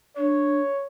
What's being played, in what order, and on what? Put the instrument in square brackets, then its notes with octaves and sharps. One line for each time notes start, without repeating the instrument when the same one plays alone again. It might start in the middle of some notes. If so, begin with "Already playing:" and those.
[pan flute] D4 [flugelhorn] C#5